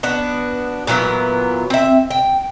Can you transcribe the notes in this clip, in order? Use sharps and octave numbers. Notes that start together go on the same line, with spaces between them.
B3 D4 F#4
A#2 E3 F#3 B3
C4 E5
G5